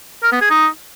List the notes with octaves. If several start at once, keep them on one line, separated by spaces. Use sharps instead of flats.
A#4
B3
G#4
D#4